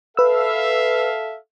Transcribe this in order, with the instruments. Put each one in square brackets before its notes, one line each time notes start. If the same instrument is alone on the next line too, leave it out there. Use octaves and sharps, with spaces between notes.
[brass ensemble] A4 E5 F5 [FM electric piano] B4 E6